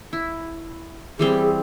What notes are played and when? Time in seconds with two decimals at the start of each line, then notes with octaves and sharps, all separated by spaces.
0.13 E4
1.19 E3 G3 C4 G#4